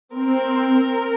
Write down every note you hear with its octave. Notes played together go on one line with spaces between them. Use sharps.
C4 A#4